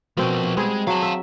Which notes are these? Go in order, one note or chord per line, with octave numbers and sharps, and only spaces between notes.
B2 F3 C4 A#4
G3 G#3 C4 G#4
F#3 F5 A5
E5